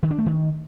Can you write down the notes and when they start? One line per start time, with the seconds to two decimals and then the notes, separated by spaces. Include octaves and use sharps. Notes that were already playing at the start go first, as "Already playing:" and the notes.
0.03 D#3
0.11 D4
0.18 A3
0.26 D#3